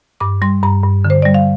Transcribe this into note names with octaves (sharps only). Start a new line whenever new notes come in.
G2 D6
G3 C6
G2 A#5
G2
D3
C5
G3 D5
F5